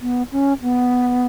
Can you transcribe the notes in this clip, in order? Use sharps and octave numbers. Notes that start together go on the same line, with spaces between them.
B3
C#4
B3